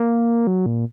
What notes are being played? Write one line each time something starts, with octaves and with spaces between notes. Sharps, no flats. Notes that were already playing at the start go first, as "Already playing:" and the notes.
Already playing: A#3
F#3
A#2